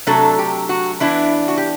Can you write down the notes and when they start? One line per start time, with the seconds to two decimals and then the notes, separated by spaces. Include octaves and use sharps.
0.07 C3 F#3 A3 D4 A4
0.39 G4
0.69 F#4
1.00 E3 B3 D4 E4
1.48 F#4
1.58 G4